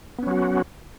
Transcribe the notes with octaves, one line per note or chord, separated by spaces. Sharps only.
F#3 B3 C#4 F#4